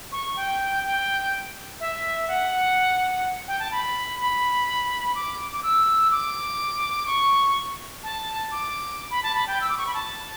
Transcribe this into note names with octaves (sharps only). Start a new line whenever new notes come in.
C#6
G5
G5
E5
F#5
G5
A5
B5
B5
D6
D6
E6
D6
C#6
A5
D6
B5
A5
B5
G5
E6
D6
C#6
B5
A5